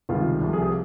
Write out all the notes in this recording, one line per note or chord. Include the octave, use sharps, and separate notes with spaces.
C#2 C3 D#3 G3 F4
C2 C3 F3 A3
G#4
G4